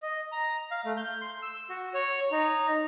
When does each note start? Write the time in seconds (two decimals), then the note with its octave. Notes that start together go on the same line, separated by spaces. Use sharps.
0.02 D#5
0.32 A#5
0.71 F5
0.85 A3
0.97 G6
1.21 C6
1.42 E6
1.69 F#4
1.94 C#5
2.31 D#4